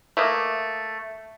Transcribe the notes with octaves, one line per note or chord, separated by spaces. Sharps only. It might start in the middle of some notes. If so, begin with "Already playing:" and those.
A3 A#3 D#5